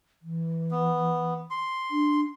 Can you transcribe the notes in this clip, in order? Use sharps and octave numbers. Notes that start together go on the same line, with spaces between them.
E3
B3
C6
D4